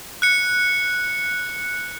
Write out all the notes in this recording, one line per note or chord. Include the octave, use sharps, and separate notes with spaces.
F#6 C#7